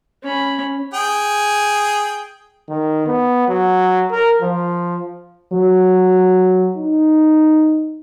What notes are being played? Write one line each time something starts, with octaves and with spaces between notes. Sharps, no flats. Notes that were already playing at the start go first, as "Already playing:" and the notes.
C#4 B5
G#4 G5
D#3
B3
F#3
A#4
F3
F#3
D#4